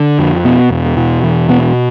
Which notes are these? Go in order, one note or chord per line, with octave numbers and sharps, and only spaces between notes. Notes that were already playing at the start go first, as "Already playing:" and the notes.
Already playing: D3
F2
B2 B3
E2
B2
E2
B2 B3